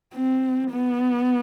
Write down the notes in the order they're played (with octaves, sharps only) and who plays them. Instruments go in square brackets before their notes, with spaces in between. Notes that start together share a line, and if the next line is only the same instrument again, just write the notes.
[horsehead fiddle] C4
B3